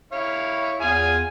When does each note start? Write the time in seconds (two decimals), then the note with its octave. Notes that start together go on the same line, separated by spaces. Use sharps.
0.12 E4 C#5 F5
0.80 E2 F4 G#4 F5 G#5